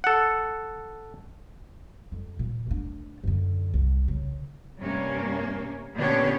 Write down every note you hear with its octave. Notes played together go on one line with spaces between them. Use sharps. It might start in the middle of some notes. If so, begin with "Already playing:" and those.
A4 F#5
F2
A#2
A3 D4
F#2 D3
C2
C#3
G2 C3 A#3 C#4
A#2 D3 B3 C#4 G4 C#5